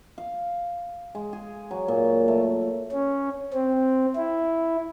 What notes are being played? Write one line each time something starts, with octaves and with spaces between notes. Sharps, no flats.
F5
G#3
G#4
F#3
A#2
A3
C#4
C4
E4